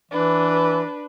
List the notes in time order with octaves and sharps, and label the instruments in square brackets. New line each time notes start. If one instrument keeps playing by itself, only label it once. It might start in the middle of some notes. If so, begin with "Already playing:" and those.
[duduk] E3 [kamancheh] D4 B4